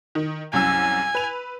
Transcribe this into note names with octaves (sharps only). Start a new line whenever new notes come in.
D#3
C2 F#2 G#5 E6
B4 F7